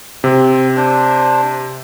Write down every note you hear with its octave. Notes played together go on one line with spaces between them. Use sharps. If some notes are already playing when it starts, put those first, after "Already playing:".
C3 C4
D4 C5